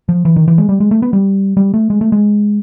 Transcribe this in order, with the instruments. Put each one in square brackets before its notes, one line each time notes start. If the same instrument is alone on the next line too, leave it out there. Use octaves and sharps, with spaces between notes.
[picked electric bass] F3
E3
D#3
E3
G#3
G3
G#3
A3
B3
G3
G3
A3
G#3
A3
G#3